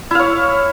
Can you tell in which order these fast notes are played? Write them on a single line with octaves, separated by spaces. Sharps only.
E4 F5 C#5